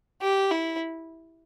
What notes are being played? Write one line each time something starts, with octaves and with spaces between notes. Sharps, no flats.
G4
E4